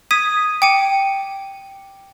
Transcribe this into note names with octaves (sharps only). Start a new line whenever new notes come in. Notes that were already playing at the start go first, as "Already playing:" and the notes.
D#6 G#6 B6 D#7
G5 D6 C#7 D#7